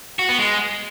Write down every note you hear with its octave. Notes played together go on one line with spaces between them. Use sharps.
F#4
B3
G#3